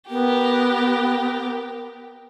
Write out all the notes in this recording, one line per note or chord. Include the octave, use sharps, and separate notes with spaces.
B3 G4 A#4